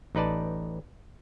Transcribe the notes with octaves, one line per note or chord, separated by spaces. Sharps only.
A1 D#4 B4 D5 A5